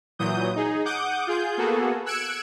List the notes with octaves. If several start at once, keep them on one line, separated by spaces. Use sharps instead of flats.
A#2 E3 F#3 D#6 G6
D#4 G#4
F#5 D6 D#6 G6
F4 G#4 G6
A#3 B3 F#4 G#4 A4
E6 F#6 G#6 C#7 D7 E7